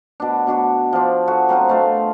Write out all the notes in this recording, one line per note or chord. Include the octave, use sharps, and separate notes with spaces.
B2 D4
B2 D4 F#4
F3 D4
F#4 G#4 A4
F#3 C4 F4 F#4
B2 A3 F5